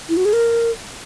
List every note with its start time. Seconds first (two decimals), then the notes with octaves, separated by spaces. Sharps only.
0.09 E4
0.17 F#4
0.25 G#4
0.33 A#4